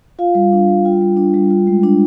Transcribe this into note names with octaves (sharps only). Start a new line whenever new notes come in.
F4 F5
G3
D4
G3
F4 G5
G3
D4
G3
F4
G#3
D4